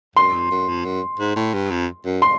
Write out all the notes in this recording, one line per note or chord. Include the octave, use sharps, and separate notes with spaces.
F#2 C6
F2
F#2
F2
F#2
G#2
A2
G2
F2
F#2
C6